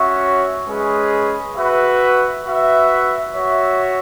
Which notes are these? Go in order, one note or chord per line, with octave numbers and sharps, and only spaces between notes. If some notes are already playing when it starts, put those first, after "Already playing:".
Already playing: C#4 F#4 C#5 E5
G#3 C#4 G#4 B4
F#4 B4 E5
F#4 B4 E5
F#4 C#5 E5